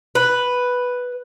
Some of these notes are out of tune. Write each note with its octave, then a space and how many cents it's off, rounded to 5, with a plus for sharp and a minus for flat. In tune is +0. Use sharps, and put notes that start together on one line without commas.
B4 +0